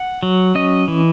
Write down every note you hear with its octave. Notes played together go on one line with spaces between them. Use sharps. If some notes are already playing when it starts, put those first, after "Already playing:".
Already playing: F#5
F#3
C#4 D#5
E3